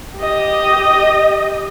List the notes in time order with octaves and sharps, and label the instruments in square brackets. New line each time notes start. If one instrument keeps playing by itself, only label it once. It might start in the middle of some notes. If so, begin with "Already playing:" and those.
[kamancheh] G4 D#5